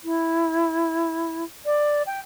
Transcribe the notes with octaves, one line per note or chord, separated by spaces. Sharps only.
E4
D5
G5